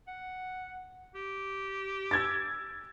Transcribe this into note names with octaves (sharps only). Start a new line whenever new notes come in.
F#5
G4
E6 G#6 A6